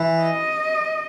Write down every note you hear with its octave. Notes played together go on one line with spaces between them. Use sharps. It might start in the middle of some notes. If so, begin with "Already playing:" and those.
Already playing: E3
D#5